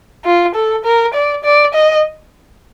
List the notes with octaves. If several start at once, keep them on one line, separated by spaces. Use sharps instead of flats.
F4
A4
A#4
D5
D5
D#5